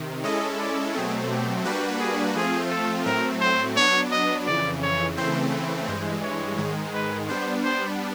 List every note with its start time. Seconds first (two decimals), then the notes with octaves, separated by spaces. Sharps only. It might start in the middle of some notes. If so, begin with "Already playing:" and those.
Already playing: C3 D#3
0.23 G#3 C#4 E4 A4 D#5
0.59 D5
0.94 B2 F#3 A3 C4 G#4
1.30 G4
1.65 G3 A#3 D4 F#4 G4 B4
2.00 G#4
2.35 F3 A3 C4 F4 G#4
2.70 A4
3.06 A2 F#3 A3 C4 A#4
3.41 C5
3.76 F#3 B3 D4 C#5
4.11 D#5
4.46 F2 C#3 E3 D5
4.82 C#5
5.17 C#3 E3 A3 C4 C5
5.52 B4
5.87 G2 E3 G#3 C5
6.23 C#5
6.58 G#2 D#3 G#3
6.93 B4
7.28 G3 B3 D4 C5
7.63 C5